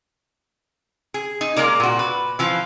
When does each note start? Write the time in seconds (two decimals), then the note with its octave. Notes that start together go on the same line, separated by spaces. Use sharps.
1.14 G#4
1.41 D#4
1.56 G#3 A#3 A#4 D5
1.80 A#2 F#4
1.99 B4
2.39 E3 F3 F4